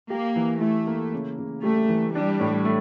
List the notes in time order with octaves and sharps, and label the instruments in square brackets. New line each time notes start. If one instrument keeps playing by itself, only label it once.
[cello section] A#3 [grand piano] G4
[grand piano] E3
[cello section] A3 [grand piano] E4
[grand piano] A#3
C#3
C#3
[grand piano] G3 [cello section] A3
[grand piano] E3
[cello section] G3 [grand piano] D4
[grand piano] A2
A3